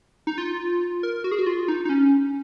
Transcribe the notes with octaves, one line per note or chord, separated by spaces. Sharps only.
D#4
F4
A#4
F#4
G#4
F#4
F4
D#4
D#4
C#4